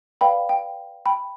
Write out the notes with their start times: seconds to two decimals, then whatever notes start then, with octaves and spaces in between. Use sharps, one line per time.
0.21 B4 D5 F5 G5 B5
0.49 G5
1.06 G5 B5